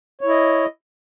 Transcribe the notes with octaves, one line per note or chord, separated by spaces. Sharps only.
E4 C#5 D#5